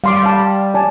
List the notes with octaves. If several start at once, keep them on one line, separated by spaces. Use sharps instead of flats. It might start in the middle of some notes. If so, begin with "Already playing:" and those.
G3 F5 C6 D6
F5 A5
D5 G#5 A5